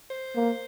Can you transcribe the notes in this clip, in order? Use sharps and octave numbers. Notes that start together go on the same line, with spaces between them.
C5
A#3